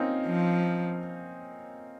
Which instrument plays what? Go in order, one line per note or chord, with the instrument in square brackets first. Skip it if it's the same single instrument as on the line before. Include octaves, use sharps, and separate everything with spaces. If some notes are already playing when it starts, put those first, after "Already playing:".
Already playing: [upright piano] A#3 C4 C#4 D#4 F4
[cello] F3